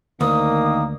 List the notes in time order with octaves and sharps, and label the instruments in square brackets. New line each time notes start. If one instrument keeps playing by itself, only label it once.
[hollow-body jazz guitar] D2 [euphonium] D#3 [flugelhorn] A#3 [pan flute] D#6